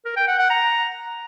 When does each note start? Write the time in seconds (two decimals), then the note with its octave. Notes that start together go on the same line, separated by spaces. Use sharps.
0.05 A#4
0.16 G5
0.27 F#5
0.39 F#5
0.50 A#5